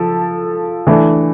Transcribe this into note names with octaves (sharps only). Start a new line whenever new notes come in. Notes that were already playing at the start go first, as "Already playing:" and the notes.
Already playing: F3 A4
E3 A3 D4